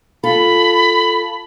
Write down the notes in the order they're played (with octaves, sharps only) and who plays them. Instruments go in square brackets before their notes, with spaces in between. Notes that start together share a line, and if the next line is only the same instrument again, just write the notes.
[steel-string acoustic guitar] F4 A4 [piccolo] B5